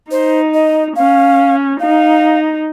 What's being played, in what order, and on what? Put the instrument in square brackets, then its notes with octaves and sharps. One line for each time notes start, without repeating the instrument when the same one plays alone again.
[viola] D#4 [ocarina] C5
[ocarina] D#5
[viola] C#4 [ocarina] F5
[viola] D#4 [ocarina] F5